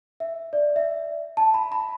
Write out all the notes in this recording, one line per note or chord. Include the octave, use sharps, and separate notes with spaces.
E5
D5
E5
A5
B5
B5